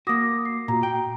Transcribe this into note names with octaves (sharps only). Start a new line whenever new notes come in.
A#3 F#4 D6 D#6 A#6
C7
A#2 F#4 A#5
G5